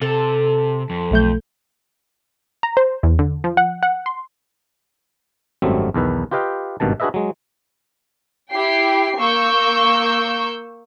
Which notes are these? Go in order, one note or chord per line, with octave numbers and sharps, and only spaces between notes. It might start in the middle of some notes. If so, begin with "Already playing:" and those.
C3 A4
F2
B1 A3 G6
A#5
C5
E2
D3
F3
F#5
F#5
C6
G#1 F#2 F#3 G3 A3 C4
B1 E2 D#3 B4
F4 G4 B4 D#5 F5 G5
G#1 G2 B2 D#3 A5
D4 F#4 G#4 B4 D#5 E5
F#3 G#3
E4 G4 G5 C7
A#3 C#6 E6 G6